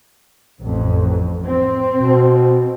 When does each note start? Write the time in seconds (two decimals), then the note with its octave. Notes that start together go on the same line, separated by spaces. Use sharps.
0.59 A1 F2
1.46 C4
1.93 B2